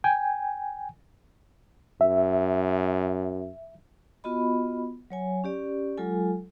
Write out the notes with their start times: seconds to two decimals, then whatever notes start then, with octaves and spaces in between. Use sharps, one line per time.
0.04 G5 G#5
2.01 F#2 E5
4.24 B3 F4 F#4 D#5 B5
5.10 F#3 C#5 G#5
5.44 C#4 G4 D5
5.98 F#3 G#3 F4 A4 G#5